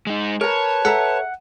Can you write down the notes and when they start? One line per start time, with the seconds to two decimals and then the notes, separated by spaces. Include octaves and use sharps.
0.07 G#3 D#4
0.41 A#4 B4 C#5 A5 A#5
0.85 A4 E5 F#5 A#5